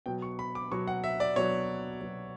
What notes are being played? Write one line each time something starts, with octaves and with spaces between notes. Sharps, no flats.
B2 F#3 G5
C#6
B5
D6
B2 F#3 C#6
F#5
E5
D5
B2 F#3 C#5
B2 F#3